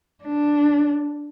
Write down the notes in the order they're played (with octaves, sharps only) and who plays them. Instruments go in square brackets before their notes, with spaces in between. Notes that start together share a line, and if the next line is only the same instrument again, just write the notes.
[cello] D4